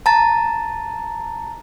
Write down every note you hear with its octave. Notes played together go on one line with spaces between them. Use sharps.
A5 A#5 A6